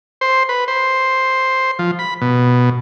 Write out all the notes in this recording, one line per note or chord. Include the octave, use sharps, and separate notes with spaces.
C5
B4
C5
F3
B5
B2